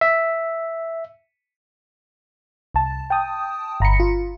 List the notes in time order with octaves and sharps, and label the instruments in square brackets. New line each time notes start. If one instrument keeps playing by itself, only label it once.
[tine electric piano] E5
[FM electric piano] C2 A5
G5 A5 D#6
G1 A#5 B5 C#7
F4